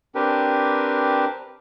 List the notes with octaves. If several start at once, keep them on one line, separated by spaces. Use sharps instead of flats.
C4 D4 G4 A#4 B4